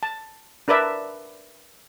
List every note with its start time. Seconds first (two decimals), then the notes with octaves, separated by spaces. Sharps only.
0.03 A5
0.68 D4 A#4 B4 D5 E5